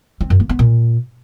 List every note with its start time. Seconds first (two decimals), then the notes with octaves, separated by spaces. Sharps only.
0.21 C4
0.30 F#2
0.40 A#3
0.49 B3
0.59 A#2